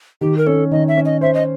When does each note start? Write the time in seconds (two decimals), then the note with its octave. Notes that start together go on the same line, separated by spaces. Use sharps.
0.21 D#3 G4
0.38 A#4
0.46 C#4 A4
0.71 D#3 D#5
0.88 E5
0.97 C#4
1.05 D#5
1.21 C5 E5
1.34 D#5